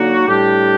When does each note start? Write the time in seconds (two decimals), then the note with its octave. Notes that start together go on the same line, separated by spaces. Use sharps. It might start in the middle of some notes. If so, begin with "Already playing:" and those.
Already playing: D3 F#3 A#3 D#4 F#4
0.27 A2 G3 D4 G4